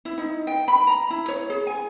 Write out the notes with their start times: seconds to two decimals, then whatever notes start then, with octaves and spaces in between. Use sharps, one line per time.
0.05 E4
0.18 D#4
0.47 G5
0.68 B5
0.87 A#5
1.10 E4
1.28 C#5
1.50 G#4
1.67 G#5